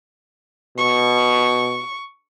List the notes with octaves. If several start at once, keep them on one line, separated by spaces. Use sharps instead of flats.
B2 C#6